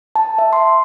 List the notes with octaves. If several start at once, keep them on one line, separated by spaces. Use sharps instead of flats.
A5
E5
C6